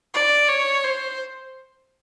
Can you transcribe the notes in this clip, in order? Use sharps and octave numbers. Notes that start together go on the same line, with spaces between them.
D5
C#5
C5